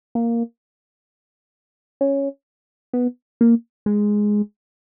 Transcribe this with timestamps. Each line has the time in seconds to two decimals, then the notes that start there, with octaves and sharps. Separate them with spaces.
0.15 A#3
2.01 C#4
2.93 B3
3.41 A#3
3.86 G#3